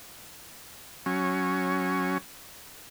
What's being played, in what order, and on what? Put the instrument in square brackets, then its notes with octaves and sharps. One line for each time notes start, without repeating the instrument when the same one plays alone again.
[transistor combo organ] F#3 C#4